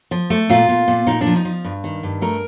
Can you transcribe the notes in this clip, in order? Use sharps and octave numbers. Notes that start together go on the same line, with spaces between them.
F3
A3
A#2 F4
A#2
A#2
A#2 D#4
D4
F3
D#4
F3
G2
D#3
G2
A3 A#4